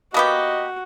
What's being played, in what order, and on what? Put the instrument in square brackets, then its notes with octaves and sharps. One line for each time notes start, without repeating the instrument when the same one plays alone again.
[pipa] A#3 B3 G4 [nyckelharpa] F#4 [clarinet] D#5